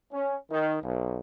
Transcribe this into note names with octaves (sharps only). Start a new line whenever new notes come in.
C#4
D#3
B1